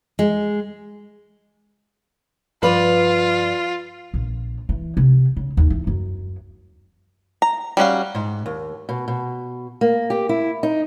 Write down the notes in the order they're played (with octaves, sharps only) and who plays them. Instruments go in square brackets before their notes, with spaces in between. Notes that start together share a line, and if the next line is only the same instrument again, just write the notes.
[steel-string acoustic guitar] G#3
[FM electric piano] G2 F3 D5 [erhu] F4 [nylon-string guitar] B4
[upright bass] A#1
E3
C3
C#3
D#2
E3
F#2
[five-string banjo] A#5
G3 C#4 F#4 F5
[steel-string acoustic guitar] G#2
D#2
B2
B2
A#3
G4
E4
D#4